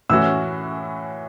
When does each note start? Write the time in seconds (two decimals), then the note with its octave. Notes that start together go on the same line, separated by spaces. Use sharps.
0.09 A2 E3 C#4 F#4 E6